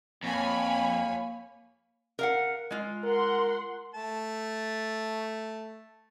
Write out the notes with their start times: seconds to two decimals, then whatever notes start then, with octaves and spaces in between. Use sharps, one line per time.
0.24 F2 A#3 C#5 G#5 B5
2.19 A#4 F5 F#5
2.71 G#3 F4
3.04 A#4 F#5 C6
3.95 A3 A5